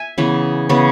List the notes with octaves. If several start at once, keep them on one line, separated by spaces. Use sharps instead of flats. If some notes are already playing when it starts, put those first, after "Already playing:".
Already playing: E5 G#5
C#3 E3 B3
C#3 E3 B3